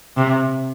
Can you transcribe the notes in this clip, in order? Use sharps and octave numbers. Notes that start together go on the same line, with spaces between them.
C3